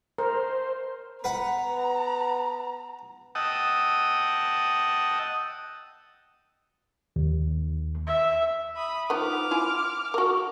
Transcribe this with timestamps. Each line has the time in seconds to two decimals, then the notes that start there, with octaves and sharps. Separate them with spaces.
0.19 A#4 C5
1.24 B3 B4 F#5 A#5
3.35 D#5 F#5 G5 A5 D#6 E6
7.16 D#2
8.07 E5
8.76 B5 D#6
9.10 D#3 F3 B3 D6 F6
9.51 E4 F4 G#5
10.14 F#4 A#4